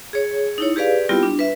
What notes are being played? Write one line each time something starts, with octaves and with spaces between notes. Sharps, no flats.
G#4 C#5
D#4 E4 C#5
G4 G#4 B4 D5 F5
G3 B3 C4 E4 F4 G4
D4
B4 E5